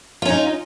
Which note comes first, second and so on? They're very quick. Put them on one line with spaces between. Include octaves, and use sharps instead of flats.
F4 C#4 D#4